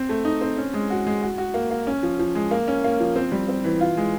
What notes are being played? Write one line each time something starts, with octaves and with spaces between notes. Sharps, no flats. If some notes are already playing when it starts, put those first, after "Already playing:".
Already playing: C4
A3
D#4
C4
C#4
G#3
F#4
G#3
F#4
F#4
A#3
A#3
C#4
F3
F3
G#3
A#3
C#4
A#3
F3
C4
G3
C4
E3
F4
G#3